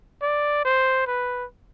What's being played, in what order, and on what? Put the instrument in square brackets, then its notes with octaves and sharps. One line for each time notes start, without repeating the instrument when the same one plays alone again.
[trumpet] D5
C5
B4